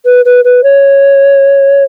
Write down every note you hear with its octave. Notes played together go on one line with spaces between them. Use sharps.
B4
B4
B4
C#5